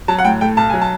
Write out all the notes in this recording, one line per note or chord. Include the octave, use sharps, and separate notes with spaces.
F#3 A5
F#5
A2 G5
A3 G5
B1 A5
F#3 G#5
A5